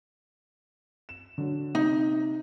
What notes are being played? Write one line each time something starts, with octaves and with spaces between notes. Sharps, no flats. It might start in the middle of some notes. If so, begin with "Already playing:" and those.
E7
D3 F#3
C3 D#4 D#5